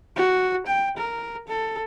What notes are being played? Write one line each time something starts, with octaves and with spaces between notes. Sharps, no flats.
F#4
G5
A#4
A4